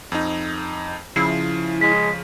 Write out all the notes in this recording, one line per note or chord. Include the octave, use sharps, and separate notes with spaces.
F2 D#4
C#3 F3 E4 C7
G#3 B6